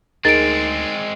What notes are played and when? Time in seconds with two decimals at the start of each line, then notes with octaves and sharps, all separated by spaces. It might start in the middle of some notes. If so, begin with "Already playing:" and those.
0.25 D2 G#3 C4 D#4 G#4 A#4 A6 D7